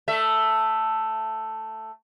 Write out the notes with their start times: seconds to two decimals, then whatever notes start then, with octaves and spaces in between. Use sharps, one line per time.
0.08 A3 E5